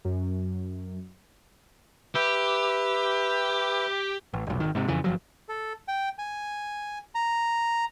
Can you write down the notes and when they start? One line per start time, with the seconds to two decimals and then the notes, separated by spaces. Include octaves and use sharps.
0.05 F#2
2.15 G4 B4 E5
4.33 A1
4.47 F1 B1
4.60 G#1 D#3
4.75 G#2 C3
4.88 F2 C#3 E3
5.04 G1 F3 F#3
5.49 A4
5.88 G5
6.19 G#5
7.15 A#5